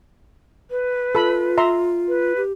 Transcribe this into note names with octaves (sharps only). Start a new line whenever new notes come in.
B4
F4 A4 B5
E5 A#5 C6
B4
G4